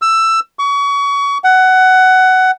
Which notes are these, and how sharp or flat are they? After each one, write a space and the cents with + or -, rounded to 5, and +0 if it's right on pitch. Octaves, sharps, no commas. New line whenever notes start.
E6 +15
C#6 +30
F#5 +15